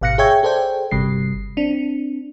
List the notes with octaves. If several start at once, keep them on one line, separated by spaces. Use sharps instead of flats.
G#1 B2 F5 F#6 A#6 C#7
G#4 C#5 E5 G5 C#6 G#6
G#4 A4 C5 D5 G5
G1 C3 G3 C7
C4 D4